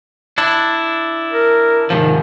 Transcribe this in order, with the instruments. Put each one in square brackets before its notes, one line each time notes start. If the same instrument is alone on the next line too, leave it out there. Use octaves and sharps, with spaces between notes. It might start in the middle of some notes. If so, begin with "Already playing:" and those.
[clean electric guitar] D4 E4
[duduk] A#4
[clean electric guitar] G#2 C3 F3 [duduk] D#3